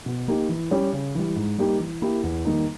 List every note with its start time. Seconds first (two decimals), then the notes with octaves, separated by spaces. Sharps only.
0.06 B2
0.28 A#3 D#4 G4
0.49 E3
0.71 G3 C#4 G4
0.93 C#3
1.15 E3 G3
1.36 G#2
1.58 G3 A#3 D#4 G4
1.79 E3
2.02 A#3 E4 G4
2.23 E2
2.45 D#3 G3 A#3 D#4